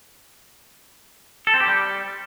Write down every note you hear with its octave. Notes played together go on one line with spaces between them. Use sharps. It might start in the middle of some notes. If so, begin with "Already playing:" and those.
A4
C4
G4
G3